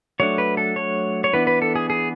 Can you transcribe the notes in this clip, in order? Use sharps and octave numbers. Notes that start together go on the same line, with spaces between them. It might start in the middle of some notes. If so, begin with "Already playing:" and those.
F#3 A3 D4 C#5
B4
A4
C#5
C#5
E3 B3 D4 B4
B4
A4
G#4
G#4